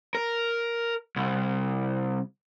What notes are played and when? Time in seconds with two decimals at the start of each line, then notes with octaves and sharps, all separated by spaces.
0.15 A#4
1.16 C2